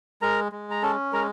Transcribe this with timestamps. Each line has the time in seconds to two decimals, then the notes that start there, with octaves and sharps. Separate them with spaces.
0.22 G#3 A#4 A#5
0.52 G#3
0.71 A#5
0.83 C#4 A4 A5
1.13 G#3 A#4 A#5